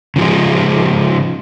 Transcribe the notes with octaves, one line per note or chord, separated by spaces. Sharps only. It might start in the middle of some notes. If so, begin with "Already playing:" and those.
C#3 F3 F#3 G#3